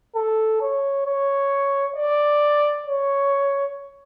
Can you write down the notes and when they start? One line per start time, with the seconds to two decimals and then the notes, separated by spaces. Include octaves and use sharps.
0.16 A4
0.61 C#5
1.06 C#5
1.96 D5
2.86 C#5